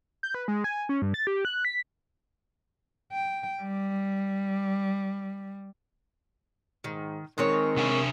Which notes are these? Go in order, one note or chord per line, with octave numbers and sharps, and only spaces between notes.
G6
B4
G#3
G#5
C#4
G2
A6
G4
F#6
B6
G5
G3
G#2 D#3
D#3 G#3 C4 A#4 C#5
C3 D4 G#5